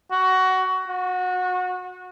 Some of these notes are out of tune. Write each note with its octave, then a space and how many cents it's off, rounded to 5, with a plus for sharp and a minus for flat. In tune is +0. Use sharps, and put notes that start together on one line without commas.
F#4 +15
F#4 -25